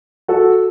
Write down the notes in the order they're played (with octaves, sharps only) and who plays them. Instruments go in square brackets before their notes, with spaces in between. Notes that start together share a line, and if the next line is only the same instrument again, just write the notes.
[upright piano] F#4 A4